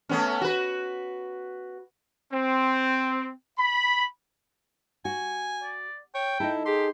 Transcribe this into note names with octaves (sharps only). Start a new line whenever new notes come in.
A3 B3 C#4
F#4 B4
C4
B5
F#4 G#5
D5
C#5 G5
D#4 E4 A4
G4 G#4 C6